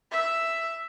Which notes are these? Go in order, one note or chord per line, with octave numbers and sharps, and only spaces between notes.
E5